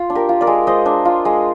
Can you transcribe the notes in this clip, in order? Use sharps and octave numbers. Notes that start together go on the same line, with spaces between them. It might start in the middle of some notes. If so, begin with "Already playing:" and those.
Already playing: F4
D4
G4 A#4
F4
A#4 D5
G#3
G#3 C5 D#5
D4
F4
G#3